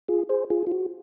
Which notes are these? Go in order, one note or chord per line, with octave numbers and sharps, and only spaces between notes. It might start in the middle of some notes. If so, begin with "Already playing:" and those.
F4 G#4
G#4 C5
F4 G#4
F4
F#4